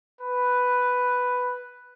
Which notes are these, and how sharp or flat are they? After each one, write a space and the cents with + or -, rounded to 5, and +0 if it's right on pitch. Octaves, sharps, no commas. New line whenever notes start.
B4 +5